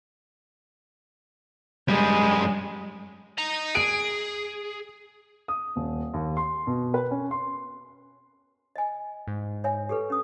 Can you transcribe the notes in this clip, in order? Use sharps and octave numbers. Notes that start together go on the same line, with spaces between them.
F#2 G3 G#3
D#5 A#5
G#4 D7
D#6
D#1
D#2
C6
B2
B4
C#4
C6
D#5 G#5
G#2
C#5 E5 G#5
G4 A4 B4
C#4 D#6